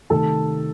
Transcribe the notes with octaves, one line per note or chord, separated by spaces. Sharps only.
C3 D#3 A3 A4 A5